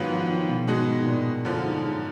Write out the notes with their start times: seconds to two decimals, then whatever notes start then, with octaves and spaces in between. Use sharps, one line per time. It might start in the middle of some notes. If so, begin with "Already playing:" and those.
Already playing: G#2 D#3 F#3 B3 F4
0.10 F3
0.21 F3
0.29 D#3
0.49 B2
0.67 G#2 B2 G#3 D#4 F#4
1.00 G#2
1.06 A#2
1.45 F#2 D3 F3
1.65 G#2
1.84 G#2